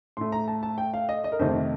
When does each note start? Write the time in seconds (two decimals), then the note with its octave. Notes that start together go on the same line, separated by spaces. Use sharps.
0.17 A2 A3 C6
0.32 A#5
0.48 A5
0.63 A5
0.78 G5
0.94 F5
1.09 D#5
1.24 D#5
1.32 A#4
1.39 F2 C3 D#3 A3 C5